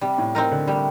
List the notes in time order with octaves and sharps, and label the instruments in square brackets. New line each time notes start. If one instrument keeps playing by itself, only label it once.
[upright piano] C3 [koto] G3
[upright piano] A2
[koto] C4 D#4 A#4
[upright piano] D3
[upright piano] C3 [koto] G3